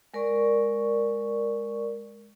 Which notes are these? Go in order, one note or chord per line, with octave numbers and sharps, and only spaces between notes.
G#3 A#4 D5 C#6